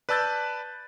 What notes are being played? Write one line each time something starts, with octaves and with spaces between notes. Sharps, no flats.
B4 D5 A5 E6 G6 A6